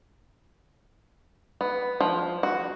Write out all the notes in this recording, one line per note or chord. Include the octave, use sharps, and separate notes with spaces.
B3
F3
F#4